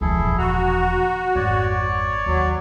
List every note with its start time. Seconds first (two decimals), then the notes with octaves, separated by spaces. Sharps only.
0.01 E1 C#2 D#3 F3 E4 G#4 A4
0.25 A#2 D3
0.38 F#4 A#5
1.35 G#1 F2 C#5 D5
2.26 D#2 F#3